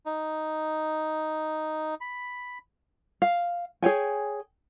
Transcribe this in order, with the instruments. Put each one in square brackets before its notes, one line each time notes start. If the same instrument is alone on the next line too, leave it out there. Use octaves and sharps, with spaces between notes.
[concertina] D#4
B5
[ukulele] F5
G#4 C#5 G5 G#5